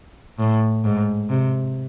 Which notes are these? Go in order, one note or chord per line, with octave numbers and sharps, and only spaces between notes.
A2
G#2
C3